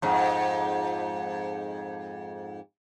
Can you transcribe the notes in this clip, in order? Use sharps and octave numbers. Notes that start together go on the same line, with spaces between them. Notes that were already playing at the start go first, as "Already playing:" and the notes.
F2 G#2